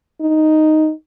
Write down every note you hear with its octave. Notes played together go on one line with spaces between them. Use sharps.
D#4